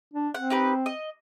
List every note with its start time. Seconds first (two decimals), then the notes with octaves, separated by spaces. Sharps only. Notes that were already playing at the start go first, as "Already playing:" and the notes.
0.13 D4
0.34 C4 F#5
0.50 D#4 G4 B4
0.86 D#5